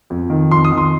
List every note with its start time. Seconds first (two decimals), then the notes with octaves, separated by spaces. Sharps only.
0.10 F2
0.30 D#3
0.51 F2 C6
0.65 D#6
0.72 D#3
0.78 C6